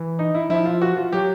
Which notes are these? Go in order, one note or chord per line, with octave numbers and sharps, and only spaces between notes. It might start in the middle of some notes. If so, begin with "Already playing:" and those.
Already playing: E3
D#4
E4
F3 E4
F4
F#4
F4
F#3 G4